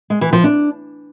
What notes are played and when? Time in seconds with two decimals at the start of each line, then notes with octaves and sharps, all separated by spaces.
0.10 G#3
0.21 E3
0.33 F3
0.44 D4